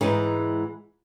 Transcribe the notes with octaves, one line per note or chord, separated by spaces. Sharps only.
G#2 E3 G#3 D#4